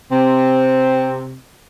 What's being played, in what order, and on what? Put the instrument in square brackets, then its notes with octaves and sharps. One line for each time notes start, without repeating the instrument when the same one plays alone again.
[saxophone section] C3 C4